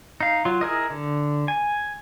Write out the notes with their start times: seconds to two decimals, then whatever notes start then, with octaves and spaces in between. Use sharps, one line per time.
0.21 D#4 F5
0.45 F#3 F4
0.61 E4 G#4 A#4 D#5
0.90 D3
1.48 G#5